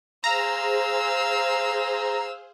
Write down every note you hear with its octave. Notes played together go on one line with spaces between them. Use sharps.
G#4 C5 F5 A#5 E6